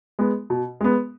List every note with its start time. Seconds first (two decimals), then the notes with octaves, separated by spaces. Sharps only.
0.19 G#3 B3
0.50 B2
0.81 G#3 B3